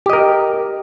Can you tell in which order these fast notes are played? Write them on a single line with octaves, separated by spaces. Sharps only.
G4 D#5 A#4